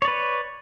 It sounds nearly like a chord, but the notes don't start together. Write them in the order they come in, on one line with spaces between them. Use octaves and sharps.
C#5 D5 B4